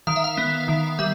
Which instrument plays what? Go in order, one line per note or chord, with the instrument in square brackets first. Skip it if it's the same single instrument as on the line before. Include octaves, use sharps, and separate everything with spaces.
[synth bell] D#3 F5
E5
F5
B3
D#3
G3 E5